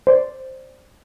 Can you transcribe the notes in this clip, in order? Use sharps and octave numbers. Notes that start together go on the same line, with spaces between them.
C5 D5